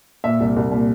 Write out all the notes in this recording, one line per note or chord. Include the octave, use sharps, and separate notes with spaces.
A#2 E5
C2
C2
A#2